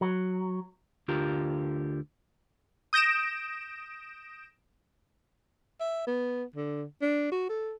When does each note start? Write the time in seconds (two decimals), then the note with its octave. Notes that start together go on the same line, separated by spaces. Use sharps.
0.01 F#3
1.08 D2 D3 F4 G4 A#4
2.93 D#6 G6 A#6 D7 E7
5.80 E5
6.07 B3
6.56 D3
7.02 D4
7.32 F#4
7.49 A4